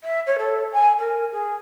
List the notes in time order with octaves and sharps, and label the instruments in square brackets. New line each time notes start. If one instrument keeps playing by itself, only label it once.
[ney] E5
C#5
A4
G#5
A#4
G#4